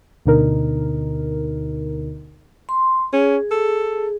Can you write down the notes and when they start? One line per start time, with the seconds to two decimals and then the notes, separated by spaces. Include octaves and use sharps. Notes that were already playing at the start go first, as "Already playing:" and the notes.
0.25 D2 B2 D3 D#4 A#4
2.69 C6
3.13 C#4 G#4
3.51 A4